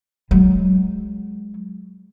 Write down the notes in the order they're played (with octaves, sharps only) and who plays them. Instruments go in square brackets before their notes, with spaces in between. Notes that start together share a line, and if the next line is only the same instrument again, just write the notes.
[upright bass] F#3 G#3